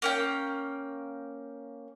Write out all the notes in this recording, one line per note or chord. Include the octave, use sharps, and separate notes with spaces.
A#3 C#4 G5